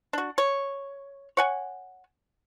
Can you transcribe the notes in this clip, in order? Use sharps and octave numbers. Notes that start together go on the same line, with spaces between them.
D4 F#4
C#5
C#5 F#5 G#5